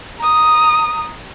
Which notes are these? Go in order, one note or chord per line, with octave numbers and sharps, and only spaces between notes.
A#5 D#6